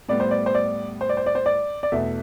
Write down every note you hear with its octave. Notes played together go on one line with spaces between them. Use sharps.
A2 G3 B3 D5
C5
D5
C5
D5
C5
D5
C5
D5
C5
D5
D5
E2 B2 A3 E5